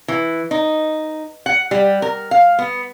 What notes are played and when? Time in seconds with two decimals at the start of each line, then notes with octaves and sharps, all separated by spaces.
0.08 E3
0.51 D#4
1.46 F#5
1.71 G3
2.02 A#4
2.31 F5
2.59 B3